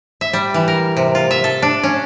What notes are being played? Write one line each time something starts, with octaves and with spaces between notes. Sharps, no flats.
E5
G3
E3
A#4
C3
F4
E5
A4
D4
C#4